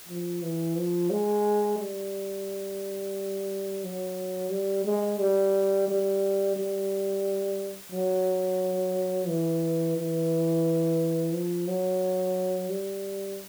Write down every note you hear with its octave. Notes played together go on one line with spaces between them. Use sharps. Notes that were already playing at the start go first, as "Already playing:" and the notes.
F3
E3
F3
G#3
G3
F#3
G3
G#3
G3
G3
G3
F#3
E3
E3
F3
F#3
G3